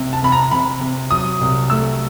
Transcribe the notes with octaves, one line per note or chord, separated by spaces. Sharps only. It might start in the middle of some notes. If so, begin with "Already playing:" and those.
Already playing: C3
A5
C3 B5
A#5
C3 B5
C3
F#3 D#6
C2
A3 E6